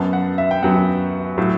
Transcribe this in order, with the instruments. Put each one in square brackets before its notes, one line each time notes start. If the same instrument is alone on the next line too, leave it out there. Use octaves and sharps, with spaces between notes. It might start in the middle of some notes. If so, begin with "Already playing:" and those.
Already playing: [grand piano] F#2 F#3 B3 A5
F#5
E5
G5
F#2 F#3 B3 F#5
A2 F#3